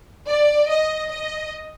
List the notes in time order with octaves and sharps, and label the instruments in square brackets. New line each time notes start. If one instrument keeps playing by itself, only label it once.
[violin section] D5
D#5
D#5